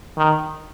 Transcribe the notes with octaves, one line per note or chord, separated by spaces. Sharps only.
D#3